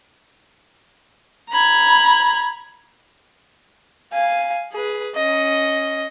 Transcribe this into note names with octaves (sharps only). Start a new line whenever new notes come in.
A#5 B5 G#6
F5 G#5
G#4 B4
C#4 D#5